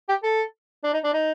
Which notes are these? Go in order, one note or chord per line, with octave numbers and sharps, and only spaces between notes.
G4
A4
D4
D#4
D4
D#4